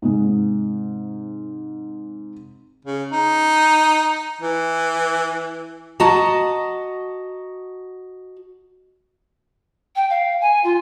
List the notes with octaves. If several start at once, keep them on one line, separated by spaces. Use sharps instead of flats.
G#2 C3 G#3
C#3
D#4
E3
F#4 D#5 A5 A#5
G5
F5
G#5
F4